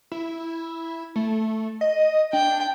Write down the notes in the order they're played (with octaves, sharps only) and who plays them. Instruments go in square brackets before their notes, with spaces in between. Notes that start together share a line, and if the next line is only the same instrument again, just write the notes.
[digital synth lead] E4
A3
D#5
[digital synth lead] D4 [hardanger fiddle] G5